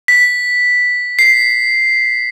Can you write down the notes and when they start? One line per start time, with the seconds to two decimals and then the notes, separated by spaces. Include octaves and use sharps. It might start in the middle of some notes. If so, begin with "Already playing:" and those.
0.08 B6
1.19 C7